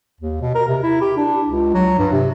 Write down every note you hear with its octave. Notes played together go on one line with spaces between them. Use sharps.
D#2
B2
A#4
C3
E4
G4
D4
C#2
F#3
G2
C3